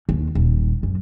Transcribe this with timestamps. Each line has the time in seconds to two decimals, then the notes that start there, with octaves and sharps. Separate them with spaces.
0.09 D#2
0.35 D#1
0.83 F#2